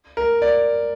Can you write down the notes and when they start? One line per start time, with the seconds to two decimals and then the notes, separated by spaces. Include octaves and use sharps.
0.17 A#4
0.42 D5